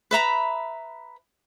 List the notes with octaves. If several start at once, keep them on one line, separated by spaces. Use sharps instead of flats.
B4 E5 A#5 B5